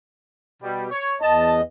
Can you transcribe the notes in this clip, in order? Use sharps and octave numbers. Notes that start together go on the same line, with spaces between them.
B2 G3 G4
C#5
E2 D#5 A5